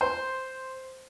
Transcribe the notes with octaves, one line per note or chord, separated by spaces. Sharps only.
C5